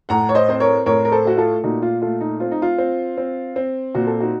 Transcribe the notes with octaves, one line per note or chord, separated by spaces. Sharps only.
A2 F#5 A#5
C#5
C5 D#5
C4 C5
A#4 C#5
A2 A#4 C#5
A#4
A4 C5
A3 F#4
F4 A4
A#2 D#4 F#4
F4
A3 F4
D#4
C4 F4
D#4
F4
C4
C4
C4
A#2 F#4
A4
D#4 F#4